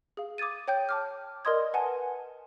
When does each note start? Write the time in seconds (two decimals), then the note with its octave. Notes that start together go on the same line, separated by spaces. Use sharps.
0.17 G#4 F5
0.38 D6 D#6 G#6 A6 D#7
0.68 C#5 G5 G6
0.89 A5 D6 F6
1.45 A#4 D5 D#5 C6 D#6 G#6
1.73 B4 F#5 G#5 A5